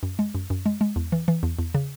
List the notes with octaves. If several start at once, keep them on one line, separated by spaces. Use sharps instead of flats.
F#2
G#3
F#2
F#2
G#3
G#3
E2
E3
E3
E2
E2
C#3